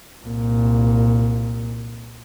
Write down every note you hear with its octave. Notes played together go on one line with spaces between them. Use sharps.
C2 A#2